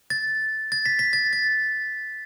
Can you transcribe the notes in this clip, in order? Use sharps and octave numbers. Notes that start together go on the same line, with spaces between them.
A6
A6
B6
B6
A6
A6